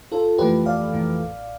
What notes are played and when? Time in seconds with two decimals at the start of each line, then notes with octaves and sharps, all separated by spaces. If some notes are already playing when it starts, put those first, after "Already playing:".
0.11 G1 F4 A4
0.38 F2 E3 A3 G4 B4
0.65 G1 D5 F5
0.93 F2 E3 A3
1.20 A1